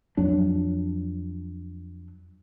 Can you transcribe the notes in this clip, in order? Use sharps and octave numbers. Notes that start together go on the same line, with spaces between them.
F2 F#3 D4